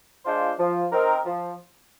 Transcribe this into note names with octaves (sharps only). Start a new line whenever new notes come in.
G#3 D4 F4 C5
F3
C4 D#4 A#4
F3